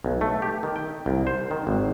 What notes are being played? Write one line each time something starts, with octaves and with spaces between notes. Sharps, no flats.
B1
A3
G4
D#3
G5
C2
C5
D#3
G#1